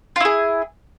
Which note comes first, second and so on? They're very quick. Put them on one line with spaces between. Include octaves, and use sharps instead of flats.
F4 E4 G#4